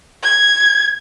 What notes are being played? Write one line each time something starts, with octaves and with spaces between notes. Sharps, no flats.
G#6